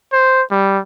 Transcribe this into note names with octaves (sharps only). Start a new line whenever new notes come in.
C5
G3